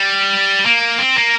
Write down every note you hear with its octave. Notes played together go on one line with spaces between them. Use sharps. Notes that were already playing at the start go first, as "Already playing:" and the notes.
Already playing: G3
A#3
C4
A#3